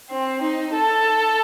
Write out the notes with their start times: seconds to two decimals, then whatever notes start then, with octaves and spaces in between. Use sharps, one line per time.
0.11 C4
0.42 D#4
0.74 A4